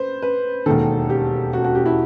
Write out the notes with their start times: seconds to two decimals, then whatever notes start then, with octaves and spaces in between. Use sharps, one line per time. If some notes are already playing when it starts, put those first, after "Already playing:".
Already playing: B4 C5
0.22 B4
0.66 E1 D#2 D#3 A4
1.10 G4
1.53 F#4
1.65 F#4
1.75 G4
1.86 E4